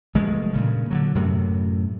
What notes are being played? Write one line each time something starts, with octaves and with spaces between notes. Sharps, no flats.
F1 E3 G#3 A3
G2 A#2 C#3
D3 D#3 F#3
F#2 A2 C3